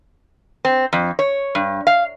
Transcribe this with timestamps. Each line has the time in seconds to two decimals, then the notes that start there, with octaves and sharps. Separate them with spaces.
0.65 C4
0.93 F2
1.19 C#5
1.55 G2
1.87 F5